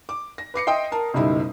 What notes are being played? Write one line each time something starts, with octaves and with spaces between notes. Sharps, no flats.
D6
A#6
B4 D6 C7 C#7
D#5 E5 G5 C6 D#6
A#4 A5
F#1 B1 G3 D#4 E4